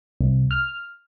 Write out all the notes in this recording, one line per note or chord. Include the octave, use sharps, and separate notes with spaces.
C2
F6